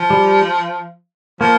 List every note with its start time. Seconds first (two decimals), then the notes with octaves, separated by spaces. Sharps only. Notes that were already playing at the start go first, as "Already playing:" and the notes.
Already playing: F3
0.10 G3
1.41 F3 A#3